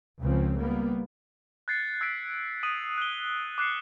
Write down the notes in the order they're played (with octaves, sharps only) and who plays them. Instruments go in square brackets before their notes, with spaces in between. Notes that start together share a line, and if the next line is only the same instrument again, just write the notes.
[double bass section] C#2 C#3 F3 C4
G3 A#3 B3
[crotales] F#6 G#6 A6 C7 C#7
E6 G#6 A6 B6 D7
D#6 D#7 F#7
F#6 G7
D6 F#6 C7 C#7